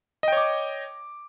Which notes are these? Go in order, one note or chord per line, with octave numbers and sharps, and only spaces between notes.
C#5 D#5 G5 D6